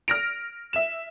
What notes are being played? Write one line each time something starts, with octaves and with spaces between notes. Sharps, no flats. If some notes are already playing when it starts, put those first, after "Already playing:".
F6 A#6 D7
E5 E7